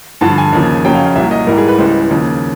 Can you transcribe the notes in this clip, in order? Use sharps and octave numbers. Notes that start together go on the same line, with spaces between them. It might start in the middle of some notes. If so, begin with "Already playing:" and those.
G2 D3 F3 A5
G#5
D#2 C#3 F3
F2 C#3 F#3 G5
F5
F5
C2 A#2 F#3 E5
D#5
G#2 E3 G3 A#4
G#4
B4
C#2 C#3 E3 G3 C5
D#2 C#3 F3